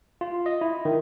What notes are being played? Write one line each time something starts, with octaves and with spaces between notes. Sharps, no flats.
F4
D#5
E4
D#3